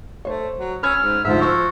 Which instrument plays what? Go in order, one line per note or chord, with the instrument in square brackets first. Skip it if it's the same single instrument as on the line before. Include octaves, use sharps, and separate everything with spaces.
[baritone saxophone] A3 [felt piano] C5 C#5
[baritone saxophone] F#3
[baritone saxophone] C#4 [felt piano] B5 E6 G#6 [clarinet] F6
[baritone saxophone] G#2
[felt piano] D2 G#2 [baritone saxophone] F3 [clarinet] E5
[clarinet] F#4 [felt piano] C#6 E6 F6